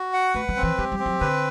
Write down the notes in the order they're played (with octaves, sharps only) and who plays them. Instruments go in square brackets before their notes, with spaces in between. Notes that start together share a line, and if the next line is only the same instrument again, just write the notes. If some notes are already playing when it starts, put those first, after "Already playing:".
Already playing: [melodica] F#4
F#5
[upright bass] A3 [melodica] B4
[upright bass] G3
[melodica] C4
[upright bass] E3
[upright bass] G3 [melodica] G4
[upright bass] G3
[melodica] C4
[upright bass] F#3
[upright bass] D3 [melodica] B4